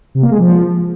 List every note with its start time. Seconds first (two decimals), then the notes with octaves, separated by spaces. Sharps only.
0.15 C3
0.23 A#3
0.31 G#3
0.38 F3